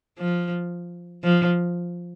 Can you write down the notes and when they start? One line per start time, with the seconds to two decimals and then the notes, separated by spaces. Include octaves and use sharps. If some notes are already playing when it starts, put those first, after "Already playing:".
0.19 F3
1.24 F3